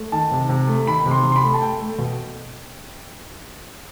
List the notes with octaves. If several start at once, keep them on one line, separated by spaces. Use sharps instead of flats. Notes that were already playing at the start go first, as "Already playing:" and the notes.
Already playing: A3
D#3 A5
C3
C3
A3
D#3 B5
C3
C6
C3
C6
B5
A3
A5
A3 G5
A3
B2